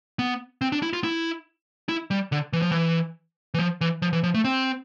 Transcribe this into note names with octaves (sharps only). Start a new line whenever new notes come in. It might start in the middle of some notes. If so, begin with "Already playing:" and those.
B3
C4
D4
E4
F4
E4
E4
G3
D3
E3
F3
E3
E3
F3
E3
F3
E3
F3
A3
C4